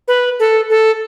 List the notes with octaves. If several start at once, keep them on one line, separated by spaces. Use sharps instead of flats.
B4
A4
A4